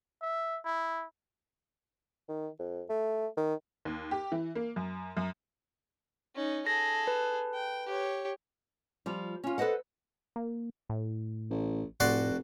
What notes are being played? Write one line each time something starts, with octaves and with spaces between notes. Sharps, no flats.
E5
E4
D#3
F2
A3
D#3
D#2
G4
E3
A#3
F#2
F#2
C#4 D#4
G#4 A4 A#6
B4
G5
G4 C#5
F3 G3
C#4 F4
A4 B4 C5 D#5 F#5
A#3
A2
A1
F1 A2 F#4 D5 C6